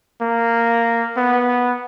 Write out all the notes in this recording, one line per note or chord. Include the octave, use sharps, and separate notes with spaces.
A#3
B3